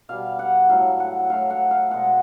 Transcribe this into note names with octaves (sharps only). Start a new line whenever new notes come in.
B2 G3 F5
F#5
A2 F#3 A3 F5
F#5
A2 F#3 A3 F5
F#5
F5
B2 G#3 F#5